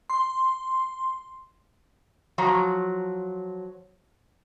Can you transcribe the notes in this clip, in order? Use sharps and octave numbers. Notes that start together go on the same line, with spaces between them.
C6
F3 F#3 A#5